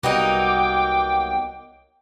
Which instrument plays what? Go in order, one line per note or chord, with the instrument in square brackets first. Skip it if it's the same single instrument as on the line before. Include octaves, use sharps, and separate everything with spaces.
[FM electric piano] C2 G3 B3 [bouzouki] F#3 A#3 D#4 [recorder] G5 [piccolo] D6